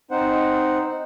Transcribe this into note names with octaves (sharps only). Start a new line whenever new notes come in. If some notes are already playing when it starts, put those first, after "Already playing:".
C4 D#4 C5 F#5